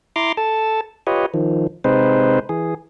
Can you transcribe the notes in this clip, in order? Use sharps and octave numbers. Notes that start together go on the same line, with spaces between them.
E4 A#5 C6 D6
A4 A5
F4 G4 B4 C#5 D#5
D#3 F3
C3 G#3 C4 D#4 B4 C5
E3 G#4